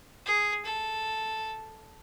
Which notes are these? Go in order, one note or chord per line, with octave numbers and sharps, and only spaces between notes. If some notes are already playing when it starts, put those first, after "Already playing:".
G#4
A4